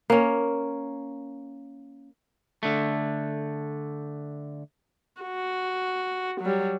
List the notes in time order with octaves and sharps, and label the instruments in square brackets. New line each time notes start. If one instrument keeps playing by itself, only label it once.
[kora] A#3 C#4
[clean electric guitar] D3 A3
[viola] F#4
F#3 G3